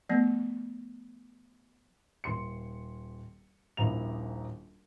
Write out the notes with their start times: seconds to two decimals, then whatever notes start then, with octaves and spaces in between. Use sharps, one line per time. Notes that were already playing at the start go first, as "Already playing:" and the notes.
0.09 F3 A3 B3
2.24 D#1 C6 C#7
3.77 D#1 A#1 E4 A#5 F7